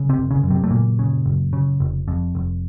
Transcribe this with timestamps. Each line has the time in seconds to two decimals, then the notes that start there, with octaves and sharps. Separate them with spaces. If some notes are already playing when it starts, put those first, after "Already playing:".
Already playing: C#3
0.09 C3 C4
0.17 F#1
0.30 C#3 C#4
0.43 F#2
0.50 C3 C4
0.64 A3
0.70 F#1 A#2 A#3
0.99 C#3
1.26 F#1
1.53 C#3
1.80 F1
2.08 F2
2.35 F1